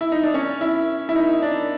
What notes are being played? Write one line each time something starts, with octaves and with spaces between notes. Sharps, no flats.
E4
D#4
D4
C#4
E4
E4
D#4
D4